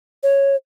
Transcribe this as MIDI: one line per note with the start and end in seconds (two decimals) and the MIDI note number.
0.23 0.56 73